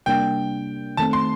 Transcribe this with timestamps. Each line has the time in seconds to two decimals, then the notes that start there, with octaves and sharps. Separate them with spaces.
0.06 C3 G3 A#3 D4 G5
0.97 D#3 A3 C4 A5
1.13 C6